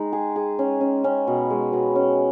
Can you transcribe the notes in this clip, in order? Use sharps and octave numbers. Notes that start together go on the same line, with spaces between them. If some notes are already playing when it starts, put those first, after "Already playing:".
Already playing: G#3 D#4
G#4
G#4
C#4
C#4
C#4
B2
G#3
B2
C#4